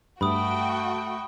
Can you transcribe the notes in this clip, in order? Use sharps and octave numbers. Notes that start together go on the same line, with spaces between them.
G2 A3 F#4 G5 B5 D#6